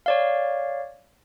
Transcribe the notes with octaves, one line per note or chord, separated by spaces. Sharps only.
C#5 D5 F5